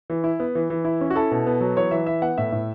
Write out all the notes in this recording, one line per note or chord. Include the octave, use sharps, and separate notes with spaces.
E3
E4
B3
E3
E3
E4
C#4
F#4
E4 A4
B2
B3
F#3
E3 C#5
E3 E5
E4 E5
B3 F#5
A2 E5
A2